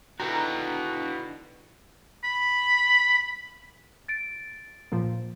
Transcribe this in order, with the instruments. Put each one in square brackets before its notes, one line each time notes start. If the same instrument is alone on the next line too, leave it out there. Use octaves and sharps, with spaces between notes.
[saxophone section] B2 [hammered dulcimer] D3 D#3 D#4 [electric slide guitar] E4 F#4 [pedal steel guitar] G5 A#5
[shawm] B5
[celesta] A6 D7
[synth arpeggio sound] A#2 F3 A#3